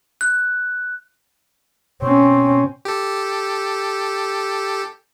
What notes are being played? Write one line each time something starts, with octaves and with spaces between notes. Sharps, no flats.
F#6
B2 C4 C#4
G4 A4